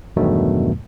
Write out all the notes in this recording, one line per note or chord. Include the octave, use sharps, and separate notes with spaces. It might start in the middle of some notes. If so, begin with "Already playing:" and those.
E2 G2 B2 D#3 F#3 A3